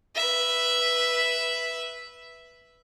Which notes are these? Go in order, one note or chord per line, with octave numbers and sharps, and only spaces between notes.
B4 E5